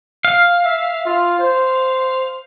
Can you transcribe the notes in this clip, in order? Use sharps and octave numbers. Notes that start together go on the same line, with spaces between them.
F5
E5
F4
C5